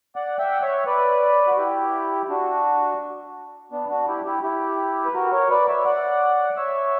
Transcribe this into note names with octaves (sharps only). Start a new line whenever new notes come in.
D5 F#5
E5 G5
F#5
C#5 E5
B4 D5
F#4
E4 G4
D4 F#4
B3 D4
D4 F#4
E4 G4
E4 G4
E4 G4
B4
F#4 A#4
A#4 C#5
B4 D5
C#5 E5
D5 F#5
C#5 E5